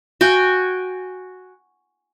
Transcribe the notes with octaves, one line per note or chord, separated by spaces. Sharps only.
F#4 G5 G#5